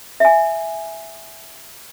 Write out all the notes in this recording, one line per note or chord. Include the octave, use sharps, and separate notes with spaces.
E5 G#5